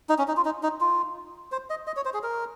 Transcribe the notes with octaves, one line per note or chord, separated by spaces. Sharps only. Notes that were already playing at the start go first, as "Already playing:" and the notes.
D#4
C#4
D#4
F4
D#4
D#4
F4
C5
D#5
D#5
C#5
C5
G#4
A#4